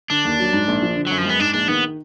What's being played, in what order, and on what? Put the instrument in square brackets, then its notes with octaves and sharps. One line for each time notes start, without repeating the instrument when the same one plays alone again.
[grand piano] D3 [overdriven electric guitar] D4
[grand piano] D#2
F#3
G#2
A#1
F3
D3
[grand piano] F#2 [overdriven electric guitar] F#3
[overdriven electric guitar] F3
[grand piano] G#3 [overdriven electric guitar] B3
[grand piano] G#2 [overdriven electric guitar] D4
[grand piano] A#1 [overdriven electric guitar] D4
[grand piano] D#3 [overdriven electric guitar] B3